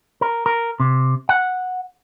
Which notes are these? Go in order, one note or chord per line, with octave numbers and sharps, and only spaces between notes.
A#4
A#4
C3
F#5